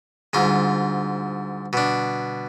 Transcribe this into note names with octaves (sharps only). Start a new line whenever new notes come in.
D2 G#2 D3 G3 D4 F4
B2 D4